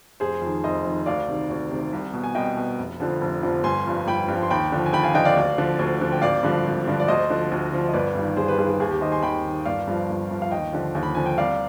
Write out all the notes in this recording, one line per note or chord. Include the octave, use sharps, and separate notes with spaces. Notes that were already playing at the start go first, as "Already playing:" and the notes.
F1 G#4 C5
F2 D#3
F1 C5 D#5
F2 D#3
D2 D5 F5
C3 D#3
D2
C3 D#3
C2
B2
G#5
C2 D#5 G5
B2
F1
F2 D3 F3
F1
F2 D3 F3
G1 G#5 C6
G2 F3
G1 G5 B5
G2 F3
C6
D#2 G5 B5
D3 F3
G#5
D#2 G5 B5
F5 G#5
D3 F3 D#5 G5
D5 F5
D2
D3 F3
D2
D3 F3
G5
G#1 D5 F5
G2 D3 F3
G#1
G2 D3 F3
D5
D2 C5 D#5
D3 F3
D2
D3 F3
D#5
G1 B4 D5
G2 D#3
G1 G#4 C5
G4 B4
G2 D#3 G#4
G#4
D#2 G#4
G4
D#3 C5 D#5
G#5 C6
D#2 G5 B5
D#3
G1 D5 F5
G2 F3
G1
G2 F3
F5
D#2 D#5 G5
D3 F3
D#2
B5
D3 F3 G#5
G5
C2 D5 F5